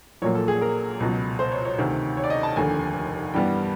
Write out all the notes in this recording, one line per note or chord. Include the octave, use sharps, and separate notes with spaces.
A#1 A#2 F#3 A#3 C#5
A4
G#4
A#4
C#2 B2 F#3
C5
C#5
C#5
D2 C3 D#3
C#5
D5
D#5
A5
F1 D#2 D3 G#5
G2 E3 G3 B3 G5